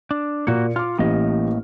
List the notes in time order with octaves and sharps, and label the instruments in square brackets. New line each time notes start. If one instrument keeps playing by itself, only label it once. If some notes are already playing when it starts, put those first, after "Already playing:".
[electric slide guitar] D4
[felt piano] A#2 C#7 [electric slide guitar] A#3 F#4
[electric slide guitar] F4 [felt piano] D6 F6
[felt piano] A1 G4 [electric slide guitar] A2 A#3 D#5